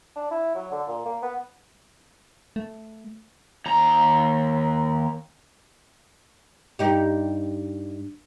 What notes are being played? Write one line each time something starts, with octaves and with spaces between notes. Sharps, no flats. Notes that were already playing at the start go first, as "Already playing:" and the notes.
D4
E4
F#3
D3
A#2
A#3
B3
A3
D#2 A#5
G2 D#4 G4